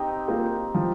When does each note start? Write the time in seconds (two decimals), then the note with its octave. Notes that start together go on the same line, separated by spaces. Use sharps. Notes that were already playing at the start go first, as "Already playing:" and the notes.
Already playing: C4 D#4 G4
0.28 A#3 F4
0.74 F3